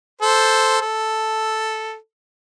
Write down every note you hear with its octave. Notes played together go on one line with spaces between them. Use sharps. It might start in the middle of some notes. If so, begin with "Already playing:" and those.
A4 C5
A4